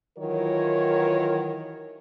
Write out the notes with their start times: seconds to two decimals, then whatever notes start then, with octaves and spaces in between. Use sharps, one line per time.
0.18 D#3 E3 F#3 F4 A#4 C#5